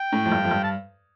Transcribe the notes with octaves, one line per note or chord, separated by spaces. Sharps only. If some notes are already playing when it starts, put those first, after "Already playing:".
Already playing: G5
A2
F2
G2
F2
G2
A5